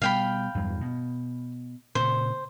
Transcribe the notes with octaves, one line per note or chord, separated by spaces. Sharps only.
B2 G3 F5 G5 B5
E2 G2 F#3
B2
A#2 C#3 C5